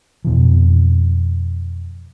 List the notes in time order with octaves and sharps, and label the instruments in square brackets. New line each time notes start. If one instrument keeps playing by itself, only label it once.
[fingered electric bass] F2 B2 E3